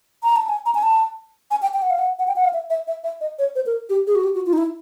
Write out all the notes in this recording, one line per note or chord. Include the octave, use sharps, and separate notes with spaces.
A#5
A5
G#5
A#5
G#5
A5
G#5
G5
G5
F#5
F5
F#5
F#5
G5
F#5
F5
E5
E5
E5
E5
D#5
C#5
C5
A#4
G4
G#4
F#4
G4
F#4
F4
D#4
E4